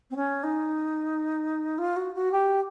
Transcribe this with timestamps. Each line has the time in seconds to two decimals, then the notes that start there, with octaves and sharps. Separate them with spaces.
0.10 C4
0.15 C#4
0.43 D#4
1.78 F4
1.96 F#4
2.14 F#4
2.31 G4